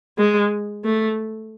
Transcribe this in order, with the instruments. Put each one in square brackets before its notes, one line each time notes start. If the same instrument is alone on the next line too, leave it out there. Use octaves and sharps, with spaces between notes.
[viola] G#3
A3